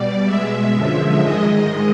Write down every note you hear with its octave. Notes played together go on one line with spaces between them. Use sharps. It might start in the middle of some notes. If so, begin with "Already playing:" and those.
Already playing: B2 G3 D5
B2 G#3 E5
F#2 D3 F3 G#3 E5
G#2 D#3 G#3 D#5